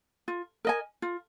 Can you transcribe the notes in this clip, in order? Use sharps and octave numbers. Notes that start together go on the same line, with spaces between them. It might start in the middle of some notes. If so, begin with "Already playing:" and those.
F4
A#4 D#5 G#5
F4